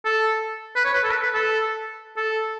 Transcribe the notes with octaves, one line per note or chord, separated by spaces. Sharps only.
A4
B4
C#5
B4
A4
B4
B4
A4
A4